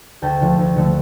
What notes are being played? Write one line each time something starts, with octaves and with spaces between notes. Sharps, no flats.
D2 G5 A5
D3 F3 A3
D2
D3 F3 A3